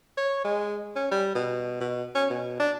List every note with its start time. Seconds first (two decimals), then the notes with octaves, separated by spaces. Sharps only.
0.18 C#5
0.44 G#3
0.96 C#4
1.11 G3
1.35 B2
1.81 B2
2.15 C#4
2.30 B2
2.60 D4